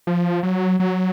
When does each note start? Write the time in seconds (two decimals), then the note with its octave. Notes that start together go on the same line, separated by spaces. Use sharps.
0.07 F3
0.43 F#3
0.80 F#3